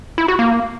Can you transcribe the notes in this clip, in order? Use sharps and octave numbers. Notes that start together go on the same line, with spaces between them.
E4
F#4
A#3